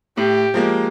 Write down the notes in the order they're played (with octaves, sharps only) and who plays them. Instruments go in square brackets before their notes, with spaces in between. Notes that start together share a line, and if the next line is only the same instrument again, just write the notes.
[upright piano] A2 [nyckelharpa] G4
[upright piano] F3 G#3 A#3